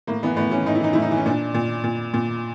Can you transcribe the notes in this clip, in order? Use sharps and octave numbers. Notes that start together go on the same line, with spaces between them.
A2 A#3
E3 B3
A2 B3
E3 C#4
A2 D#4
E4
E3 D#4
A2 E4
D#4
E3
C#4
A#2 D4
A#2
A#2
A#2